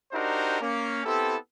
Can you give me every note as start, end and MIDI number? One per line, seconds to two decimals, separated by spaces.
0.13 0.60 62
0.13 0.60 63
0.13 0.60 66
0.13 0.60 67
0.13 0.60 70
0.13 0.60 72
0.61 1.01 58
0.61 1.01 61
1.05 1.36 59
1.05 1.36 60
1.05 1.36 64
1.05 1.36 67
1.05 1.36 69